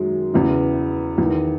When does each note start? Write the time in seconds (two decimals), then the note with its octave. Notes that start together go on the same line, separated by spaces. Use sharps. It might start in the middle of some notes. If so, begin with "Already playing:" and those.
Already playing: F#2 D#3 F#3 G#3
0.33 E2 C#3 E3
1.18 E2 D#3